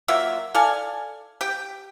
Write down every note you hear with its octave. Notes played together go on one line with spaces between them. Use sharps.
F#3 A#3 F4 E5
A4 D5 F5 G#5
G4 G5